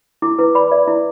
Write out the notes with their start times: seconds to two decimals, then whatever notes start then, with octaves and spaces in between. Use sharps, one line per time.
0.22 E4 D6
0.39 E4 B4
0.55 D5 B5
0.71 D5 E5
0.87 E4